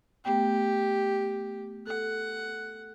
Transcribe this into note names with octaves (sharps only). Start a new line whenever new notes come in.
A3 B3 G4 G5
A4 F#5